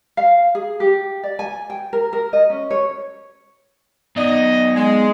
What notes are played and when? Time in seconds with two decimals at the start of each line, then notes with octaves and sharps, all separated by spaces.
0.17 F5
0.55 G#4
0.80 G4
1.23 D5
1.39 G#5
1.70 G5
1.93 A#4
2.13 A#4
2.33 D#5
2.50 C#4
2.70 C#5
4.16 B3 D#4 D5 D#5
4.75 G#3